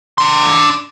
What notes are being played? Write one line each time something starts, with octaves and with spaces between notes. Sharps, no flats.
D4 C6